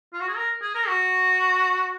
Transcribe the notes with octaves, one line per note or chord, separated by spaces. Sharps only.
F4
F#4
G#4
A#4
G#4
A#4
F#4